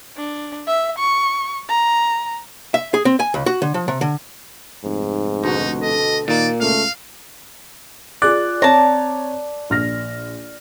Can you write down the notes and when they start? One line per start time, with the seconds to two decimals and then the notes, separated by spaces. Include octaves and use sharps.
0.17 D4
0.67 E5
0.98 C#6
1.69 A#5
2.74 E5
2.94 G#4
3.05 C4
3.20 G#5
3.34 C#2
3.46 F#4
3.62 D3
3.74 F3
3.88 C3
4.01 D3
4.84 F1 G#2
5.44 D2 B2 D#4 F#4
5.82 A4 D#5
6.28 A#2 D#3 A#3 D5
6.61 C#2 A3 F5
8.22 F4 G#4 D5 F#6
8.62 C4 C#5 A5 A#5
9.70 A#1 F6 A#6